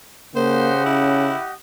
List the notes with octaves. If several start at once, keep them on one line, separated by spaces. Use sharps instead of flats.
C#3 A#3 G4 C5 D#5 F#5
C#4 E4